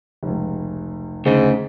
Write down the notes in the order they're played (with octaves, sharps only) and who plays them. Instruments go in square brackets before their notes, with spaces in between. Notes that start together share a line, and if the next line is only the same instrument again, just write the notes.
[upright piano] F1 C#2
[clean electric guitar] D2 C#3 [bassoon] G#2